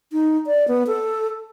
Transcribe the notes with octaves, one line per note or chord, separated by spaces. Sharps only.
D#4
D5
B3
A4